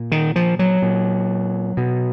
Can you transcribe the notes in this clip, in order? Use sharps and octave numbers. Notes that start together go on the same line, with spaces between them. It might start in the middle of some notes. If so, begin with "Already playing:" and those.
Already playing: A#2
D#3
F3
F#3
A#2
B2